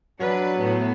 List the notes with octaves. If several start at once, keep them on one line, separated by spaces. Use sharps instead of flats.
F#3 D4 B4
A2 B3